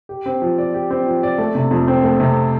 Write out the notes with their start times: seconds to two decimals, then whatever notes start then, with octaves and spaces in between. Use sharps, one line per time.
0.09 G4
0.26 C4
0.42 F3
0.58 D5
0.74 G4
0.91 C4
1.06 F3
1.23 D5
1.38 A3
1.55 C3
1.71 F2
1.87 C4
2.04 A3
2.20 C3